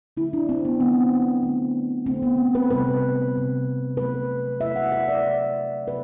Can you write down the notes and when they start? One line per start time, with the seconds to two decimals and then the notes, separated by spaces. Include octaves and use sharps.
0.17 D3 F#3 A3 E4
0.33 D4
0.49 C4
0.65 B3
0.80 D3 F#3 A3 B3
1.43 D3 A3
2.06 D3 A3 C4
2.22 B3
2.55 B4
2.70 C3 G3 B4
3.34 C3 G3
3.97 C3 F#3 A3 B4
4.61 C3 F#3 A3 E5
4.76 F#5
4.92 E5
5.08 D5
5.24 C3 F#3 A3
5.87 C3 F#3 B4